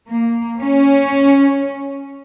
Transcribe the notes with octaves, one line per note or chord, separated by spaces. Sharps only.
A#3
C#4